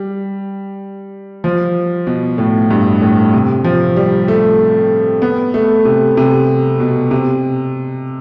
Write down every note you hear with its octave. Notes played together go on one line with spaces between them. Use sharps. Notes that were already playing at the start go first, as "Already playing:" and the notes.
Already playing: G3
F3
B2
A2
G2
A2
C3
F3
G3
A3
B3
A3
C3
C3
B2
C3